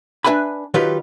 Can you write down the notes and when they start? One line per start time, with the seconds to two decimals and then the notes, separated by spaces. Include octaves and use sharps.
0.24 D4 B4 E5 G#5 B5
0.74 D#3 F#3 D#4 F4 G4 B4